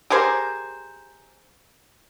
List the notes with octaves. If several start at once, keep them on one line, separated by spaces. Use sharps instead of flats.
G4 G#4 A#4 C5